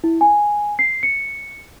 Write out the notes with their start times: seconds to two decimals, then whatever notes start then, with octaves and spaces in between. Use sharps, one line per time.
0.04 E4
0.21 G#5
0.79 C7
1.03 C#7